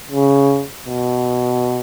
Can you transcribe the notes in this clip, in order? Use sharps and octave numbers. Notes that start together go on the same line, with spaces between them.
C#3
B2